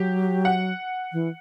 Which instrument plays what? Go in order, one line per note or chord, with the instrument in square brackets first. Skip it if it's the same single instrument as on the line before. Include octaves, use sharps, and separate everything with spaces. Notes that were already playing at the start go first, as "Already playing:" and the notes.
Already playing: [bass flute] F#3 [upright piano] G4
[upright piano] F#5
[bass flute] E3